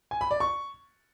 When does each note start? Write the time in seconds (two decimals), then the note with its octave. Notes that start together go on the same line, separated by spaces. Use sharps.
0.11 G#5
0.21 B5
0.31 D5
0.40 C#6